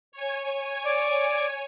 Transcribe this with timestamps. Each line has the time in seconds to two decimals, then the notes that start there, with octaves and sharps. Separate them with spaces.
0.12 C#5 G#5
0.85 D5